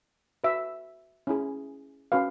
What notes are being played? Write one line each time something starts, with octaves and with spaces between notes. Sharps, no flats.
F#4 B4 E5
C#4 E4 G#4
C#4 F#4 B4 F5